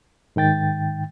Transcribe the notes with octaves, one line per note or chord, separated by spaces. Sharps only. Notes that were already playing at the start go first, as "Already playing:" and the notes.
G#2 D#3 G5 A6